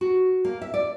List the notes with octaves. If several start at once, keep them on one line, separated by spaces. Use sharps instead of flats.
F#4
A#3
E5
D5